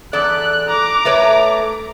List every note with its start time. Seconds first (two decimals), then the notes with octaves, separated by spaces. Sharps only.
0.13 E2 A4 D5 F#6
0.68 A#5 D6
1.05 A3 B4 C#5